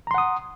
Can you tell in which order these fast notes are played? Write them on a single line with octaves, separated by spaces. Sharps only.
A#5 C6 F#5 D#6